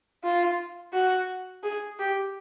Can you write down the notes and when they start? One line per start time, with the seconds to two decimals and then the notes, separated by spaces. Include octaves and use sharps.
0.24 F4
0.94 F#4
1.63 G#4
1.99 G4